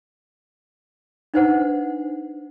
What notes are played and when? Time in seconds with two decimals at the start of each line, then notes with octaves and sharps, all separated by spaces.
1.34 D4 D#4 B4 C5 F#5